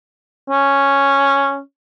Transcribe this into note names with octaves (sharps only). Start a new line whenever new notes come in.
C#4